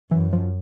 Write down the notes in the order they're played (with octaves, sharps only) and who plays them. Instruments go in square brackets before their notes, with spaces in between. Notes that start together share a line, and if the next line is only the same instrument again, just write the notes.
[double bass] F#2 [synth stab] E3
[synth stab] F3